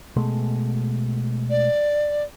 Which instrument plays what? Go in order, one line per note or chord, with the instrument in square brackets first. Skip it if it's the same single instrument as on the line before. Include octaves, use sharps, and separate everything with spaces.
[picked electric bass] B2 G#3 A3
[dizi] D5